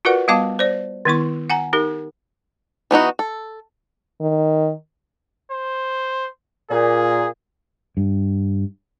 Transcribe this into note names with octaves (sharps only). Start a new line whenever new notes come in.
F4 F#4 A#4 B4 D5 F#5
G3 B3 F5 A5 D6
C5 D5
D#3 B3 E4 C#6
F#5 G#5 A#5
D#4 G4 A#4
E3 B3 D#4 F#4
A4
D#3
C5
A#2 G#4
G2